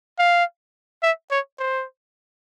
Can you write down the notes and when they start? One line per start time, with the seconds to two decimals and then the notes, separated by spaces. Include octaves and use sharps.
0.19 F5
1.03 E5
1.31 C#5
1.59 C5